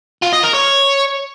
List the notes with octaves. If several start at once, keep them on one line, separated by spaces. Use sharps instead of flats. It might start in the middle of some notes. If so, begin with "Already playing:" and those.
F4
D#5
A#4
C#5